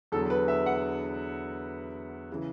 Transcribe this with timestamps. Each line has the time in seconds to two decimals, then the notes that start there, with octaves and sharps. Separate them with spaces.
0.12 E2 D3 F#3 A4
0.30 B4
0.48 E5
0.66 F#5
2.32 C#3 E3